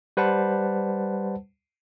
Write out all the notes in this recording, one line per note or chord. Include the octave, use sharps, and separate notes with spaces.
G3 B4 C5 F#5 A5